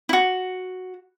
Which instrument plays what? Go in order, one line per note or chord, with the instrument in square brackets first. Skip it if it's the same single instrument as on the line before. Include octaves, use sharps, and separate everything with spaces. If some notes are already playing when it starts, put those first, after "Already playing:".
[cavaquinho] E4 F#4